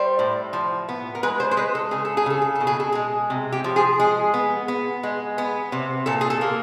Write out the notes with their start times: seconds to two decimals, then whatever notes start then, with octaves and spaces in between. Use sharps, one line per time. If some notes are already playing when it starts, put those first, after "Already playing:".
Already playing: G3 C5
0.19 A2
0.53 F3
0.89 B3
1.15 A#4
1.23 G#3 B4
1.40 C5
1.51 C5
1.57 G#3 B4
1.75 A4
1.91 C#3 G#4
2.05 A4
2.17 G#4
2.26 C#3 A4
2.42 G#4
2.55 B2 A4
2.67 G#4
2.80 A4
2.92 G#3 G#4
3.30 C3
3.52 G4
3.64 F3
3.76 G#4
4.00 G#3 G#4
4.34 B3
4.68 B3
5.03 G#3
5.38 B3
5.72 C3
6.06 A#2 A4
6.21 G#4
6.30 A4
6.41 A#3